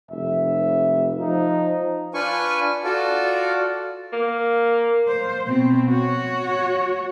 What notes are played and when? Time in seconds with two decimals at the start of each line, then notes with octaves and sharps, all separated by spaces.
0.11 F1 E5
1.19 F3 D#4
2.14 D4 F4 B4 G#5 C#6
2.85 F4 F#4 A4 D5
4.13 A#3
5.08 C5
5.46 B2 C4
5.89 F#4 C#5